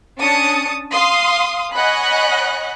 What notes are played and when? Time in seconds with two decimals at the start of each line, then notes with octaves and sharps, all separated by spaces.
0.19 C#4 D4 A5 D#6 C#7
0.92 F5 C6 D#6
1.74 C#5 D#5 F#5 G#5 B5 F#6